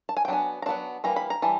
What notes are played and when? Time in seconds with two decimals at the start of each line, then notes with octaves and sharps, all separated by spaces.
0.09 A5
0.17 G#5
0.25 G5
0.28 F#3 B3 D4 G#5
0.62 A#5
0.66 F#3 B3 D4 A5
1.04 E3 G3 A#3 A#5
1.16 B5
1.30 A#5
1.42 E3 G3 A5